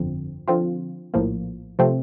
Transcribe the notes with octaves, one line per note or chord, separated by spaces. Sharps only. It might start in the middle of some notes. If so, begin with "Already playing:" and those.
Already playing: G1 F2 D3 F3 C4
D3 F3 C4 F4
A#1 A2 F3 A#3
C3 F3 A3 C4